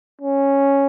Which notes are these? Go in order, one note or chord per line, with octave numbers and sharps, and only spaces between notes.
C#4